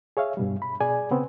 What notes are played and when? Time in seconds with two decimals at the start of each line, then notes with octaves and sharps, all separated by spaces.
0.17 G#4 C#5 E5 F5
0.37 G2 B2 G3
0.62 B5
0.80 B2 G#4 D5 G#5
1.11 C#3 B3 C4